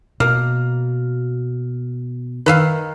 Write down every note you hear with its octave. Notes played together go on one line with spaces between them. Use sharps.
B2 A#3 F6
D#3 B4 E5 F5